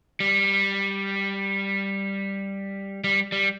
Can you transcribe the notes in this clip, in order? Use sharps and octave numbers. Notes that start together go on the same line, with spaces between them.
G3
G3
G3